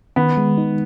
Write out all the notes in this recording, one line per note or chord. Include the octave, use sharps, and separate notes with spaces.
D#3 B3
G#3
D#4